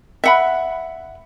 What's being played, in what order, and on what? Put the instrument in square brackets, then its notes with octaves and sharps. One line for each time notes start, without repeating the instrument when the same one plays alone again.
[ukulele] E5 F#5 B5